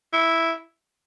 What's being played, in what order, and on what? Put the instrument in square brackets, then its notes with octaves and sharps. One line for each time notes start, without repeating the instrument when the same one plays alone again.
[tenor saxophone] E4